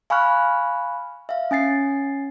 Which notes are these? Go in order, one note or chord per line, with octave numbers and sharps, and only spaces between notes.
F5 G#5 B5 C#6 F6 F#6
E5 F5
C#4 G#5 A6 C7